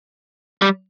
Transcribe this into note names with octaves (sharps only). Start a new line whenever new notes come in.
G3